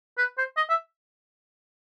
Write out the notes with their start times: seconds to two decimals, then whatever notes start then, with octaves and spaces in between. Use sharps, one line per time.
0.18 B4
0.38 C5
0.57 D#5
0.70 E5